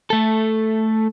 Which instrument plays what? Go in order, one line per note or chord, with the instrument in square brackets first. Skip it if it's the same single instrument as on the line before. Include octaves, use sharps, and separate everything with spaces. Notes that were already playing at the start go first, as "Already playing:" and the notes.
[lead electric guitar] A3 A4